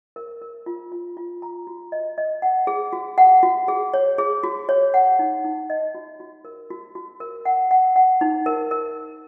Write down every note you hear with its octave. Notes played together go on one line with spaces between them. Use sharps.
A#4
A#4
F4
F4
F4
A#5
F#4
D#5
D#5
F#5
G#4
F#4
F#5
F#4
G#4
C#5
G#4
F#4
C#5
F#5
D#4
D#4
D#5
F#4
F#4
A#4
F#4
F#4
A#4
F#5
F#5
F#5
D#4
A#4
A#4